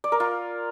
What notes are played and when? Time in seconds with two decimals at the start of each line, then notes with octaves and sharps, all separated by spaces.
0.04 D5
0.12 A#4
0.20 F4